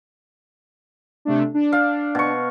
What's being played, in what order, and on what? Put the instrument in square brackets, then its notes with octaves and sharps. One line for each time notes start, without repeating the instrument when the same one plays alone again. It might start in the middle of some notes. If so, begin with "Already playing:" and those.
[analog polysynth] C3 A3 D4
D4
[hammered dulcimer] F5
B2 C#6